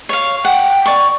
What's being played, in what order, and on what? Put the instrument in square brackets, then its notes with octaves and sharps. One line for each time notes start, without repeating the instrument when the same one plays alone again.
[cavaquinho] C#5 F5
[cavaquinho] F#5 [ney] G5
[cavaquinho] D5 C#6